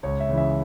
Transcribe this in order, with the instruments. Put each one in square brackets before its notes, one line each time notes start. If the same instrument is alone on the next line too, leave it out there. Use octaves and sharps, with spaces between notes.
[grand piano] C#2 C#5
E5
C#3 E3
E5